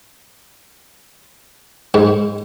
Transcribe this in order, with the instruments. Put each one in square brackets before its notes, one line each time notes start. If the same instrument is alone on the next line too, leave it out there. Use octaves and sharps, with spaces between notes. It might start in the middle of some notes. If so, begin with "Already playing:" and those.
[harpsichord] G#2